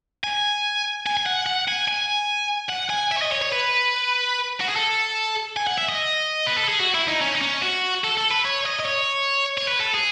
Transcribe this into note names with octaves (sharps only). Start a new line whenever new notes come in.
G#5
G#5
G#5
F#5
F#5
G#5
G#5
F#5
G#5
E5
C#5
D#5
C#5
C#5
B4
F#4
G#4
A4
G#5
F#5
E5
D#5
B4
A4
G#4
F#4
E4
D#4
C#4
D#4
C#4
F#4
A4
A4
B4
C#5
D#5
D#5
C#5
C#5
B4
A4
G#4